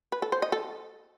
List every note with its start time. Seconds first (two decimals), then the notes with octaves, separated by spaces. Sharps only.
0.12 B4
0.22 A4
0.32 C5
0.42 D#5
0.52 A4